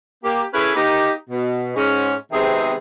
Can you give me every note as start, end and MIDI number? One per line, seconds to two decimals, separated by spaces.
0.24 0.42 58
0.24 0.42 67
0.54 0.72 61
0.54 0.72 64
0.54 0.72 68
0.54 0.72 69
0.54 0.72 71
0.75 1.10 58
0.75 1.10 63
0.75 1.10 67
1.30 1.71 47
1.76 2.13 44
1.76 2.13 61
2.32 2.74 48
2.32 2.74 51
2.32 2.74 56
2.32 2.74 59
2.32 2.74 60
2.32 2.74 68